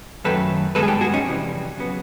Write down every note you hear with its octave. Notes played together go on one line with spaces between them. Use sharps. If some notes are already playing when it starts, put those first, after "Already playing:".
F#2 D#3 F#3 A3 A4 B4
G2 D#3 G#3 B3 A4 B4
G#4
G4 A4
F#4 G#4
C#4 D#4
F2 C3 E3 G3
C#3 F#3 B3